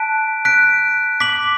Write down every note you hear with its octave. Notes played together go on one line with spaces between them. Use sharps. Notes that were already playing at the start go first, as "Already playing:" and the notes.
Already playing: A5 F#6 B6 D7
F#6 B6 D7
D6 B6 F#7